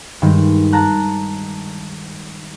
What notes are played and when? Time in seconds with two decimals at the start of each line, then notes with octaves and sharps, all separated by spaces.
0.22 G2 D#3 G#3
0.72 A5 A#5 F#6